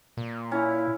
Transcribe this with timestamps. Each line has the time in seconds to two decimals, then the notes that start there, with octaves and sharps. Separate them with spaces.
0.17 A#2
0.52 C#4 E4